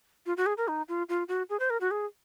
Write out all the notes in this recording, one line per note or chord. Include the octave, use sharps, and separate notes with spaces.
F4
F#4
G#4
A#4
D#4
F4
F4
F#4
G#4
C5
A#4
F#4
G#4